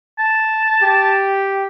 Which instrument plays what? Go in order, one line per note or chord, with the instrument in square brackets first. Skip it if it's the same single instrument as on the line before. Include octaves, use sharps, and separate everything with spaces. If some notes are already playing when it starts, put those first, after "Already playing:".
[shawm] A5
[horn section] G4